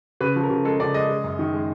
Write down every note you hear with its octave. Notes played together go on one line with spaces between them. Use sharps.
C#3 B4
F3
A#4
C#3
G#3 A4
C#3 D5
G#3 D#5
G#3
F#2
D#3
G#3